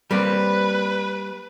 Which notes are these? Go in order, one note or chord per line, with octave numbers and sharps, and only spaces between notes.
G3 A#3 C4 B4